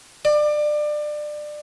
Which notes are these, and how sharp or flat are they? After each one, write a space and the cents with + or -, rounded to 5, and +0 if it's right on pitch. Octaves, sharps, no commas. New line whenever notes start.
D5 +25